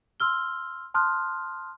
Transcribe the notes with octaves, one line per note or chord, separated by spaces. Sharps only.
C6 E6 F6 G7
A5 C6 D#6 F6 F#6